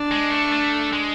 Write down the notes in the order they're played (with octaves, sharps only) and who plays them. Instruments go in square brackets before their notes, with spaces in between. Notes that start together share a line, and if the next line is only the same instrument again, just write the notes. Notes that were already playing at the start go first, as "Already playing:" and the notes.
Already playing: [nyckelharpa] D4
[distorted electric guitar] G#3
A3
A3
G#3